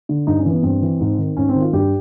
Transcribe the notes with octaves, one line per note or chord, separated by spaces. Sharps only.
D3
G2 D#4
C#4
E3 B3
G2 C4
E3
G#2
D#3
G#2 C#4
C4
D#3
F4
G2 G4